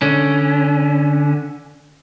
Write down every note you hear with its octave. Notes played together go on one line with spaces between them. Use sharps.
D3 C#4